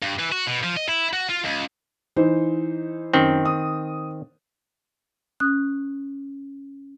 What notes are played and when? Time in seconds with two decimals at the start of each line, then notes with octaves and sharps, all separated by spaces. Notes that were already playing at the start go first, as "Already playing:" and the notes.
0.02 G2
0.19 E3
0.32 F#4
0.47 B2
0.64 F3
0.77 D#5
0.89 E4
1.13 F#4
1.29 F4
1.44 C#2
2.16 E3 D#4 C5
3.14 F#2 D#3 C4
3.45 D#6
5.40 C#4 D#6 F#6